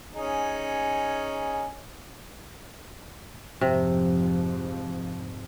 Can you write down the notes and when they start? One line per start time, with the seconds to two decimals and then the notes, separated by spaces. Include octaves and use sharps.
0.14 C#4 D#4 G#4
3.61 F2 G#2 C3 F3